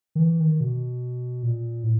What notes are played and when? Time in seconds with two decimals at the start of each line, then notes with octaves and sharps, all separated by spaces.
0.15 D#3
0.19 E3
0.40 D#3
0.60 B2
1.43 A#2
1.83 A2